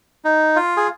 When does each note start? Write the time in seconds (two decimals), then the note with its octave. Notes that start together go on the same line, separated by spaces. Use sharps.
0.25 D#4
0.56 F4
0.77 G#4